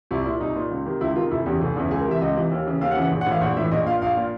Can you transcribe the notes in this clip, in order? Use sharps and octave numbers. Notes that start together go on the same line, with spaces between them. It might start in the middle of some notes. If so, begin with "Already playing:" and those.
C2 E4
A#2 E4
C2 D#4
A#2
C#2
C3 D#3
C#2 E4
C3 D#3 F4
F1 E4
E2 C#3 E3 G4
F1
E2 C#3 E3
C#2 G#4
A#4
C3 E3 E5
C#2 D#5
C3 E3
D#2
C#3 E3
D#2 F5
F#5
C#3 E3
F#5
A#1
F#5
A2 E3 F5
A#1 F#5
A2 E3 E5
A#1 D#5
A#2 F5
A#1 F5
A#2